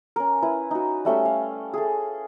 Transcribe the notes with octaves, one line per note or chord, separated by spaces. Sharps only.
C#4 A#4
E4 B4
D#4 F#4
G3 A3 C#4 E5
F5
G#4 A4